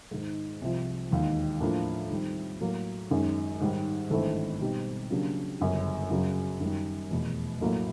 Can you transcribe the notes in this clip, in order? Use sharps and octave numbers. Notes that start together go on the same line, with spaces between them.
G#2 D#3 G#3
C2 C3 F3
E1 D#2 D#3
A2 F3 A#3 D4 F4
D#3 G3 C4
A2 F#3 A#3
F#2 D#3 G#3 C#4
G#2 D#3 G3
G#1 G2 E3 A3 C4
B2 G3 C4 D#4 G4
C#3 F#3 A#3 D4 G4
G1 F#2 C#3
F#2 C#3 F#3
F#2 D#3 G3
F1 E2 B2
A#1 A2 F#3 A#3